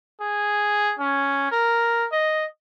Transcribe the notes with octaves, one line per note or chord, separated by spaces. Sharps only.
G#4
C#4
A#4
D#5